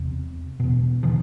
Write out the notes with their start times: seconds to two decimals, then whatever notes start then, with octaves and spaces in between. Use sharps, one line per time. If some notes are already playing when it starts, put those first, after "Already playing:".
Already playing: E2 C3
0.60 E2 B2
1.03 D#3 F3